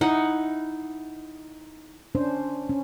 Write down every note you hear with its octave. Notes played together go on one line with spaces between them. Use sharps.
D#4 E4 F#5
C#4 D4 C5
C#4